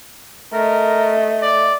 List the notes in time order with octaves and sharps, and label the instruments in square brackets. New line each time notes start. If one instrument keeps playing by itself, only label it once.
[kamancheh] A3 D#5 [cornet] A#4
[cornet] D5